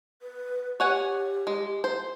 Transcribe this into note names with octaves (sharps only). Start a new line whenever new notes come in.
B4
G4 C#5 F#5 G#5
G#3
C5